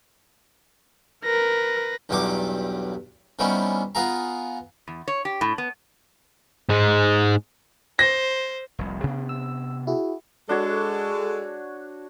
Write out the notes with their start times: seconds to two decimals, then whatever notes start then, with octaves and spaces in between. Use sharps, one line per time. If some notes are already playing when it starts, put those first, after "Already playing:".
1.24 A#4 B4 A#6
2.09 B1 E2 G2 F#3 G4 D6
3.39 C3 D#3 G3 B3 C#4 E4
3.95 B3 F4 G#4 A#5
4.88 E2
5.08 C#5
5.25 G4
5.41 A2
5.58 B3
6.69 G#2 G#3
7.99 C5 A#6
8.79 F1 C2
9.03 C3 B3 D4
9.29 E6
9.87 E4 F#4 G#4
10.49 G#3 D4 F#4 A4 C#5